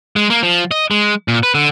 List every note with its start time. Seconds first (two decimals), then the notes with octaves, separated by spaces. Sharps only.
0.16 G#3
0.30 A#3
0.43 F3
0.71 D#5
0.91 G#3
1.28 A#2
1.43 B4
1.55 D3